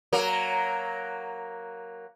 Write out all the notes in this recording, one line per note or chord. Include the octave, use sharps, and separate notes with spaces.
F#3 A#3 A#4